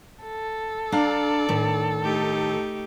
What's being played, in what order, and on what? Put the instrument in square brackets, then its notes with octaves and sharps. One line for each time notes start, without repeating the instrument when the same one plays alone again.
[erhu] A4
[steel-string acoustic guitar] D4 F5 A#5 [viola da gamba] D5
[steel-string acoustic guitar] A2 D#3
[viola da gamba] A3 D#4 G4